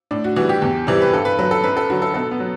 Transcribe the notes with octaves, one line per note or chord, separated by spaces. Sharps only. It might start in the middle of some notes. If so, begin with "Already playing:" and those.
A2 D4
F#4
E3 G3 F#4
G4
E2
C3 E3 G3
B4
G2 A4
B4
F#3 B4
A4
F#2 B4
A4
D3 F#3 F#4
A4
B2 A4
B3
F#3